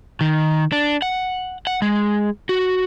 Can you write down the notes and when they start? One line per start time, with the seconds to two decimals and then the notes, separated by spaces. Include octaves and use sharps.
0.21 D#3
0.72 D4
1.02 F#5
1.67 F#5
1.82 G#3
2.49 F#4